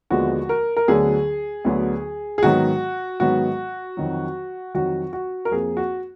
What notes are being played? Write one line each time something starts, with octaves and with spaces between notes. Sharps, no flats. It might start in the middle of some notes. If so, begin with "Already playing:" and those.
D#2 D3 F3 G#3 B3 F#4
A#4
A#4
D2 D3 F#3 B3 G#4
D2 D3 F#3 B3
G#4
G#2 D#3 F#3 B3 F#4
G#2 D#3 F#3 B3 F#4
F2 D#3 F#3
F2 D#3 F#3 F#4
F#4
A#4
F2 F3 A#3 G#4
F#4